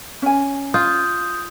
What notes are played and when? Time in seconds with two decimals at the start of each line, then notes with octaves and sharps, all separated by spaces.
0.22 C#4 G#5
0.74 F4 D#6 G6